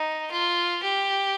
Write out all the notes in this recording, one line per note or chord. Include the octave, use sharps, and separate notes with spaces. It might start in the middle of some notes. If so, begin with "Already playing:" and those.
Already playing: D#4
F4
G4